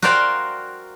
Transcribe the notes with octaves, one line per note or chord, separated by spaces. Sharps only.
F#4 A#4 C5 D5 F5 G5